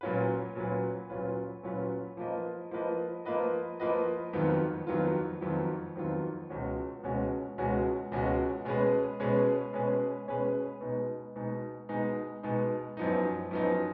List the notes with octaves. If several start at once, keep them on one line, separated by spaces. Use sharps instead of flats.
A#2 F#3 C#4 F4 B4
A#2 F#3 C#4 F4 B4
A#2 F#3 C#4 F4 B4
A#2 F#3 C#4 F4 B4
F3 A#3 F4 B4 D#5
F3 A#3 F4 B4 D#5
F3 A#3 F4 B4 D#5
F3 A#3 F4 B4 D#5
F2 D#3 F#3 B3 F4
F2 D#3 F#3 B3 F4
F2 D#3 F#3 B3 F4
F2 D#3 F#3 B3 F4
C#2 B2 G#3 C#4 F#4
C#2 B2 G#3 C#4 F#4
C#2 B2 G#3 C#4 F#4
C#2 B2 G#3 C#4 F#4
B2 G#3 C#4 G#4 B4
B2 G#3 C#4 G#4 B4
B2 G#3 C#4 G#4 B4
B2 G#3 C#4 G#4 B4
B2 G#3 B3 D#4
B2 G#3 B3 D#4
B2 G#3 B3 D#4
B2 G#3 B3 D#4
F#2 F3 B3 D#4
F#2 F3 B3 D#4